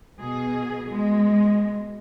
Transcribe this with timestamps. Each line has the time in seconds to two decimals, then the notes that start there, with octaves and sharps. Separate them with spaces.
0.17 B2 G#4
0.85 B2 G#3